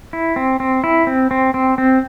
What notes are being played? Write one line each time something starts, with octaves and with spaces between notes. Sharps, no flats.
E4
C4
C4
E4
C4
C4
C4
C4